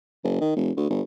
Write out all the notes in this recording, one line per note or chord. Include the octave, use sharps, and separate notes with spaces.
F#1
D#3
F1
D2
G1